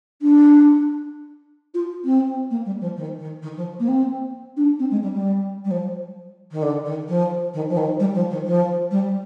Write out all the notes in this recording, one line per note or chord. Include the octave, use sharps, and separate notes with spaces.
D4
F4
C4
A#3
G3
F3
D#3
D#3
D#3
F3
A#3
C4
D4
C4
G#3
G3
G3
G3
F3
D#3
D3
D#3
F3
D#3
F3
D#3
G3
F3
D#3
F3
G3